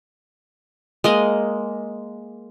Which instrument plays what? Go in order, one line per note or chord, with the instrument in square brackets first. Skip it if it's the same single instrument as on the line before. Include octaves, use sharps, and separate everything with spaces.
[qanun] G#3 A#3 D#5